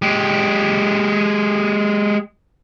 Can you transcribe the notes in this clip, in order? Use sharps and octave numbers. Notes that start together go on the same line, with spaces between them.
G#3 G4